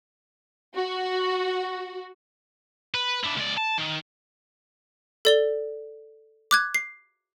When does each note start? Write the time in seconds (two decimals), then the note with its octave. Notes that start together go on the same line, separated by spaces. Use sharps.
0.75 F#4
2.95 B4
3.24 D4 E4
3.37 C#2 D5
3.58 A5
3.78 D#3
5.25 A4 D5 G7
6.51 D6 F#6 G#6
6.75 C7